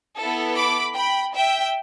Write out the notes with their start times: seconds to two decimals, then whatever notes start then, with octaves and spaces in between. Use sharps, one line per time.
0.16 B3 E4 A4
0.55 B5 D6
0.95 G5 B5
1.35 E5 G5